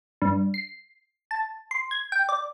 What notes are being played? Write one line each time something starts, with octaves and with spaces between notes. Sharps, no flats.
G2
C7
A5
C6
G#6
G5
D5